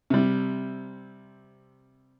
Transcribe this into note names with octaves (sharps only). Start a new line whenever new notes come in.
C3 G3